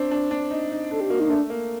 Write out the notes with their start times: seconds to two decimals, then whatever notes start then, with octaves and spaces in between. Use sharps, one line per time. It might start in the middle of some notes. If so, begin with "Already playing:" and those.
Already playing: C4 D4
0.11 D4
0.31 D4
0.51 D#4
0.71 D#4
0.91 D4 A4
1.01 G4
1.10 A#3 F#4
1.20 D#4
1.29 A3 D4
1.50 A#3